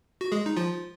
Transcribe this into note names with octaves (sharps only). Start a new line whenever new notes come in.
F#4
G#3 G#4
D#4
F3 F4